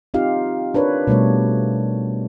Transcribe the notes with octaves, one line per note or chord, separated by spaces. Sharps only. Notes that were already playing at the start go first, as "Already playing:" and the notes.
C4 D#4 F4 G4 F5
D4 A#4 B4 C#5
B2 G3 A3 C#5